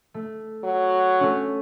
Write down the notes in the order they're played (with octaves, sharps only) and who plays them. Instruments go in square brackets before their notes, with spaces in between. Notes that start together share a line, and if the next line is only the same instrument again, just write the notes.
[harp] A3
[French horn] F#3
[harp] A3 C#4